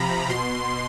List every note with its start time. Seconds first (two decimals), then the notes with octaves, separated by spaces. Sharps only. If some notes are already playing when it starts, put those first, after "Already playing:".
Already playing: C3 F3 A#5 B5
0.29 B2 C6